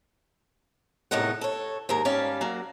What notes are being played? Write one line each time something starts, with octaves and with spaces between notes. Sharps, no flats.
E2 A2 C3 D#4 A#4 F#5
A4 C#5
D#2 G#2 A#4
G#2 G3 C#4 D5 F5 A5
F#3 A#3 F#4